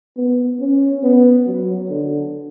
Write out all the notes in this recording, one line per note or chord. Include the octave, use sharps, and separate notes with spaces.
B3
C#4
B3
F#3
D3